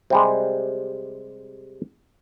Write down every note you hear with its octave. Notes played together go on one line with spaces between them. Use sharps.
C3 G3 G#3